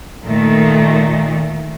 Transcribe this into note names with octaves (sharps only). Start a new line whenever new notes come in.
A#2 D#3 A3